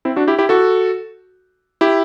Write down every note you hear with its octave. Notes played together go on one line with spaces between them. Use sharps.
C4 E4
D4 F#4
E4 G4
E4 G4
F#4 A4
E4 G4